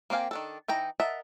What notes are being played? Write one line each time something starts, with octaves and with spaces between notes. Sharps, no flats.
A#3 C4 G4 F5 G#5
D#3 D4 A4
E3 D#4 G5 A#5
A#4 D#5 E5 F#5 A5